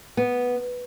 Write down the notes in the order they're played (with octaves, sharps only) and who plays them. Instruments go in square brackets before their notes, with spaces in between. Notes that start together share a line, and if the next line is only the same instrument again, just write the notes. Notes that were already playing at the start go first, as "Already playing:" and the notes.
[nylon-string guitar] B3